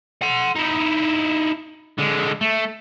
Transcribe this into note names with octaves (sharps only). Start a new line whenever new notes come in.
F#5 C6
D#4 E4
D3 G#3
A3